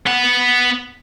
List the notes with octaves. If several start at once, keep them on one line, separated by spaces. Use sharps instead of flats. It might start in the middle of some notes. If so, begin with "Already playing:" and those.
B3 F#5